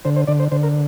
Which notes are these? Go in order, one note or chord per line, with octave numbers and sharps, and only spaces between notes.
D3 C5
C5
D3 D5
C5
D3 C5
A#4